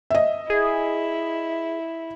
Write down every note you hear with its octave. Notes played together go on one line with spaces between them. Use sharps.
D#5 E5
E4 G#4